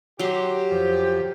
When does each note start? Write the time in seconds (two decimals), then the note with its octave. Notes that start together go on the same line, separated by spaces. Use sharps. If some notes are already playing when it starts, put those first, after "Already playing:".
0.19 F#3 G4 C6
0.71 F2 C5